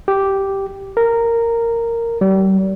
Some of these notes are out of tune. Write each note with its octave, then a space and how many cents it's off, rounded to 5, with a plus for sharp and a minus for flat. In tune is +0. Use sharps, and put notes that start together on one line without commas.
G4 -5
A#4 -10
G3 -35